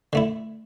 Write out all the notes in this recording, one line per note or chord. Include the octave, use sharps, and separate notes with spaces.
D3 A3 E4